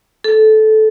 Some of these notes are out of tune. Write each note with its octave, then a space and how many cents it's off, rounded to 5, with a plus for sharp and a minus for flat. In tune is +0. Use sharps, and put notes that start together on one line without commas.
A4 -15